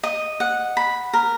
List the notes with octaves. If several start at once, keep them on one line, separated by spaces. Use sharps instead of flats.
D#5
F#5
B5
A#4